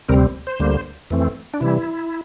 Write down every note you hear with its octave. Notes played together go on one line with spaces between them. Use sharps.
D2 C3 G3 C4 A#4
C5
D2 D3 G3 A#3
F2 E3 A3 C4
D4
C3 E3 G3 E4